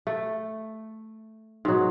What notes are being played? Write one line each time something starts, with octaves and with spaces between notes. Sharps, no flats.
A3
G#2 B2 F#3